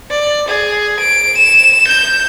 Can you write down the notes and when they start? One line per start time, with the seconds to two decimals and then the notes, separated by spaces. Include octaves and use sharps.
0.11 D5
0.48 G#4
1.00 D7
1.38 E7
1.88 G6